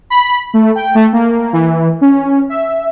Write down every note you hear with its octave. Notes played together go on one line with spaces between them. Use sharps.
B5
A3
G5
A3
A#3
E3
C#4
E5